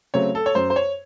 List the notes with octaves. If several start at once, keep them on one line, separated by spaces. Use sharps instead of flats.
C#3 F#3 A3 C4 C#5
A4
C#5
F#2 C5
C5
C#5